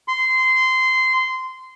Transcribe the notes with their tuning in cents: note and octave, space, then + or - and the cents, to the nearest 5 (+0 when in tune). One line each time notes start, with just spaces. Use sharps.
C6 -15